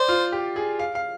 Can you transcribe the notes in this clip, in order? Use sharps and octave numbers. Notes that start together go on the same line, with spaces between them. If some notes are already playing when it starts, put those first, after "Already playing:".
Already playing: C5 D5
F4
G4
G#4
F5
F5